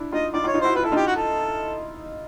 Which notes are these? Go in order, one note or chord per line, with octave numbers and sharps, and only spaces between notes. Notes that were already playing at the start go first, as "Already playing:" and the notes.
Already playing: D4 E4
D#4 F4 D#5
D#4 F4 D5
D#4 F4
C#5
D#4 F4
E4 F#4 C5
F4 B4
E4 A4
D#4 F4 G4
F#4
A4